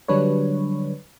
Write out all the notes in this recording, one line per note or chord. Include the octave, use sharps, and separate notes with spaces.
D3 F#3 G3 D4 B4 C#5